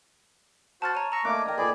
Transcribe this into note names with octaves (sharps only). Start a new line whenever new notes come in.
F#4 C5 F#5 A5 F6 A6
C#5 A#5 D#7
A#5 C#6 E6 A#6
A3 A#3 D#4 D5 G#5 D6 F#6
A#4 G5 A#5
A#2 G#4 A4 B4 D5